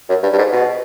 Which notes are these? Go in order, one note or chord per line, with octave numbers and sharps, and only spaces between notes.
F#2
G2
G2
G#2
B2